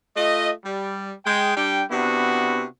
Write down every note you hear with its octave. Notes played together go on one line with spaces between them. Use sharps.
A3 F4 D#5
G3
G#3 G5
G3 D4 G5
C3 B3 D4 E4 F#4